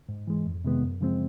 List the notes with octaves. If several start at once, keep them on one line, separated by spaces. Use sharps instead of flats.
G#2
E3 G#3
F2
C3 D#3 G#3 B3
F#2
C#3 F3 G#3 C4